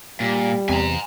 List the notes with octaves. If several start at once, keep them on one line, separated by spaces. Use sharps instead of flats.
A#2 G3
E2 C3 G#5 A#5